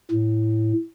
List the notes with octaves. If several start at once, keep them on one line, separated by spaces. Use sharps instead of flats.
A2